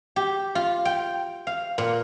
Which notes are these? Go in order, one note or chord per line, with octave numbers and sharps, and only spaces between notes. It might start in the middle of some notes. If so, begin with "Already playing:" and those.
G4
F4
G5
F5
A#2